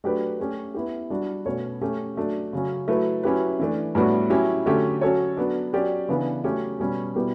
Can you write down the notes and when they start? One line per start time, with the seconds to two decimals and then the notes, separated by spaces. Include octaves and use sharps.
0.04 F#3 A3 D4 G4 B4
0.39 A3 C#4 G4
0.74 B3 E4 G4
1.10 G3 D4 F#4
1.45 B2 A3 C#4 F#4 C#5
1.81 A3 C#4 G4
2.17 F#3 A3 D4
2.53 C#3 F#3 C#4
2.88 F#3 A3 E4 B4
3.23 F#3 C#4 E4 G4 B4
3.59 E3 A3 D4
3.95 A2 G3 B3 D4 F#4
4.30 F#3 C#4 E4 G4
4.66 D3 F#3 A3 C#4 G4
5.01 F#3 C#4 F#4 A4 C#5
5.37 F#3 B3 D4
5.73 F#3 C#4 G4 D5
6.09 C#3 E3 B3 D4
6.44 F#3 A3 C#4 G4
6.79 B2 G3 C#4
7.15 B2 G3 B3 E4 G4